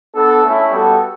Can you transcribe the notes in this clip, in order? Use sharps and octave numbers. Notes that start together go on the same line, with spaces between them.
B3 D4 A4
A3 C#4 E4
G3 B3 F#4 A4